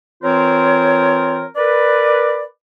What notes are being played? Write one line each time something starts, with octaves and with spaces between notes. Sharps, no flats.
E3 C4 F4 A#4 C5 C#5
A#4 B4 D5